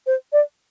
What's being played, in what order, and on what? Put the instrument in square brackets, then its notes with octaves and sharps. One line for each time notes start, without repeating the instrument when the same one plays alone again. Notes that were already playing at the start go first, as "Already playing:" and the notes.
[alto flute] C5
D5